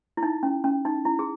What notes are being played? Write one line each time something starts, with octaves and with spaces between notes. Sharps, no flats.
E4
D#4
C#4
C#4
D#4
E4
G#4